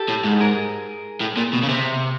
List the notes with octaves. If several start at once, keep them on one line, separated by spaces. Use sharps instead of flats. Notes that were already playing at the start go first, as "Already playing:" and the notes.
Already playing: G4 A4
A2
G#2
G#4 A#4
A2
A#2
B2
C#3
C3